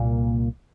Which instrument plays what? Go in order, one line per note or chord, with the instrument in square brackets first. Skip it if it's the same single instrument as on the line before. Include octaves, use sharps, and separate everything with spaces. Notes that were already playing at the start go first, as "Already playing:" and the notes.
Already playing: [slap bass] C2 A#2 A#3